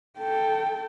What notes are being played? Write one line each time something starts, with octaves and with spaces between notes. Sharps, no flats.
A4 G5